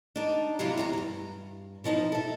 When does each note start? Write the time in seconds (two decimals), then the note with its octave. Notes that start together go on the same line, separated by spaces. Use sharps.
0.16 D4 D#4
0.59 C3 F#3 G3 E4 F4
0.77 E2 F#4 A#5
0.93 D2 G2
1.84 B2 F3 D#4 E4
2.12 A4 E5